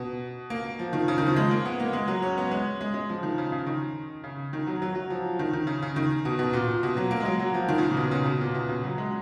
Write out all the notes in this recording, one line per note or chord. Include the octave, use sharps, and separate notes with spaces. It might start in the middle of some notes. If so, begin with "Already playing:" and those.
Already playing: B2
A#3
F3
D#3
C#3
D#3
F3
G#3
A#3
B3
A#3
G#3
F#3
C#4
B3
G#3
G#3
G#3
F3
D#3
C#3
C#3
D#3
C#3
D#3
F#3
F#3
F#3
F3
D#3
D#3
C#3
C#3
D#3
B2
B2
A#2
A#2
B2
F#3
A#3
G#3
F#3
F#3
F3
D#3
C#3
A#2
B2
C#3
B2
A#2
B2
C#3
F#3
G#3